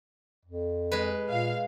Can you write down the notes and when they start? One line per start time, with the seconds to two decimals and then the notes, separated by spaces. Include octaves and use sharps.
0.45 F2
0.92 G#3 B4
1.29 A#2 F5